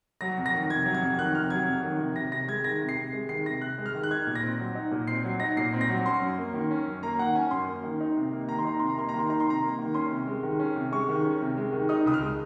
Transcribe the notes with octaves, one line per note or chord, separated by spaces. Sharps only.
F#3 A#6
F2
A#6
D#3
C3 G#6
F#3
G#6
F2
D#3 F#6
C3 F6
F#3 G#6
F2
D#3
C3
C3 A#6
C3 A#6
G#3 G#6
D#3 A#6
C3
C7
C3
G#3
D#3 C7
C3 A#6
C3 F#6
G#3
F6
D#3
F#6
D#4 G#6
A#2
A#6
C4
F#3
D#4
A#2
C4 C7
F#3
D#4 A#6
A#2 C7
C4
A#6
F#3
C#4 C6
F#2
A#3
D#3
C#4
F#2
A#3 A#5
D#3 F#5
C#4 G#5
F#2 C6
A#3
D#3
D#4
C3
A#3
D#3 A#5
C6
D#4 A#5
C3 C6
A#5
A#3 C6
A#5
D#3 C6
D#4 A#5
C6
C3 A#5
A#3
D#3
C#4 C6
C3
G#3
D#3
C#4
C3
G#3 C#6
D#3
C#4
C3
G#3
D#3
D#4 D#6
C#2 D#6
F6
G#3